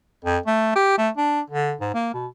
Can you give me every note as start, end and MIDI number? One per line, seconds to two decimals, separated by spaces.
0.25 0.38 41
0.46 0.75 57
0.76 0.95 67
0.98 1.10 57
1.17 1.41 62
1.50 1.74 50
1.81 1.91 44
1.94 2.11 58
2.14 2.27 47